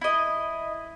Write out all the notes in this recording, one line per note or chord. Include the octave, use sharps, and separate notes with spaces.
E4 D#5